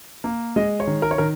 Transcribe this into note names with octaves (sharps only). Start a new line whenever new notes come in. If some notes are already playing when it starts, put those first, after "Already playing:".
A#3
G#3 D#5
C#5
D#3
A#4
C#5
D#3 A#4